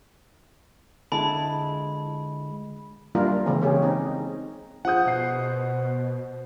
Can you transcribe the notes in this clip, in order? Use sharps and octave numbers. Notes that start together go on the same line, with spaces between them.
D3 G#3 E4 A5 B5
G3 A#3 D4 E4 F4 A#4
C#3 E3 G#3 A#3 C4
G#3 A#3 C#4 G4 G#4
C4 D#4
F3 G#4 C5 F#5 D#6 G6
B2 G6 C7